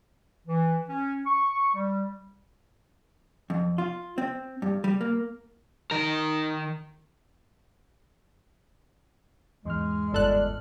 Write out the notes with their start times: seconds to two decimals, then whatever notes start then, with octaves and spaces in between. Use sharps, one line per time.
0.46 E3
0.89 C#4
1.26 C#6
1.73 G3
3.50 F2
3.78 F4
4.18 C4
4.62 G2
4.84 G3
5.01 A#3
5.91 D#3 A#4
9.65 E2 G#2 G#3 F6
10.13 G1 A4 D5 F#6